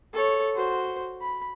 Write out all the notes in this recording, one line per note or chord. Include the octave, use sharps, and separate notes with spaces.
A4 C#5
F#4 C5
B5